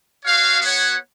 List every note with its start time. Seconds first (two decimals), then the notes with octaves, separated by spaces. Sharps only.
0.24 F#4 C#5 F5
0.60 B3 F#4 C#5 F#5